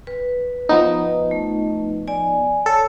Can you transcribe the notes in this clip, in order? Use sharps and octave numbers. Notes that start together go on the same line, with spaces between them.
B4
F3 B3 D#4
A3
D5 G#5
A4 C#5